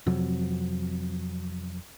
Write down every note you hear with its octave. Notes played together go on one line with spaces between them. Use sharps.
F2 C3 F#3